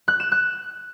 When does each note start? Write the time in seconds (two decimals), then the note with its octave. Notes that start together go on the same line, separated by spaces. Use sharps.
0.08 F#6
0.20 E7
0.32 F#6